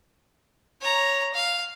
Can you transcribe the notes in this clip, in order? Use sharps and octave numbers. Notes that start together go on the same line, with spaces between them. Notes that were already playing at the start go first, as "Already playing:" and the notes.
C#5 A#5
F5